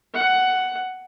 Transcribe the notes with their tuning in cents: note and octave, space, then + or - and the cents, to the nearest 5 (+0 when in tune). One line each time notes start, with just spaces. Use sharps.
F#5 +10